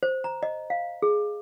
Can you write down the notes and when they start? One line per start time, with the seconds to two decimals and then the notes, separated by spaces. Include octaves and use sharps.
0.03 C5
0.24 A#5
0.43 D#5
0.70 F5
1.02 G#4